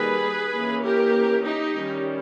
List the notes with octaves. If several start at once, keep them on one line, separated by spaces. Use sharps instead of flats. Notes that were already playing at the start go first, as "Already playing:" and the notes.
Already playing: D#3 G3 A#3 G#4 B4
E3 A#3 C#4
G4 A#4
D#4 G4
D#3 G3 C#4